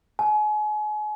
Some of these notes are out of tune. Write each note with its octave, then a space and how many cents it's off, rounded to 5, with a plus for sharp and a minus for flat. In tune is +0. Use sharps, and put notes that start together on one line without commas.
G#5 +35